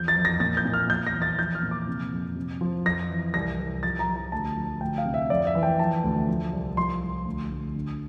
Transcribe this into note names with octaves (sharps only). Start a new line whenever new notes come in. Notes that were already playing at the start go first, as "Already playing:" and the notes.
Already playing: E2 F3 G6
A6
F2
A#6
A#2 A6
G6
A#2
F6
F3 G6
A#6
E2
A6
F3 G6
F6
A#2
D6
C3
F2
C3
F3
F2 A#6
E3
C2 A#6
C2
F3 A6
A#5
F3
A#5
D2 A5
F3
D2 G5
F5
C3
E5
F2 D5
E5
E3
G5
F3 A5
D2
F3
C2
F3 C6
C2
D2
D2
D3